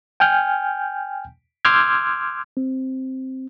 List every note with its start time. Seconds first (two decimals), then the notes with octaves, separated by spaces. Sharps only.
0.20 G5 G#5 F6 G6
1.65 C6 D6 E6 F6 G6 G#6
2.57 C4